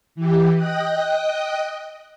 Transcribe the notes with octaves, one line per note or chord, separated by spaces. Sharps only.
E3 G4
D#5 G5 D#6 F#6